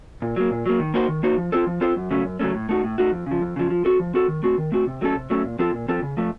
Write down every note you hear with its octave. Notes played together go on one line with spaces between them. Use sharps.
A#2
F#3 A#3
A#2
F#3 A#3
D#3
A#3 D#4 F#4 C5
D#3
A#3 D#4 F#4 C5
F3
C4 F4 A4 C5
F3
C4 F4 A4 C5
F#2
C#3 F#3 A3 C#4
F#2
C#3 F#3 A3 C#4
A2
A3 D#4 F#4
A2
A3 D#4 F#4
F2
C#3 F3
F2
C#3 F3
F3
C4 F#4 A4
F3
C4 F#4 A4
D#3
A3 C4 F#4
D#3
A3 C4 F#4
C3
F#3 A3 C#4 A4
C3
F#3 A3 C#4 A4
A#2
F3 C4 F4 A4
A#2
F3 C4 F4 A4
C#3
F3 A3